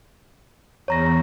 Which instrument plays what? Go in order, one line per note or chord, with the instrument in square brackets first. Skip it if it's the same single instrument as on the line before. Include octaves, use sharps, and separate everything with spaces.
[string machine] E2 [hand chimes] C#5 A#5 A#6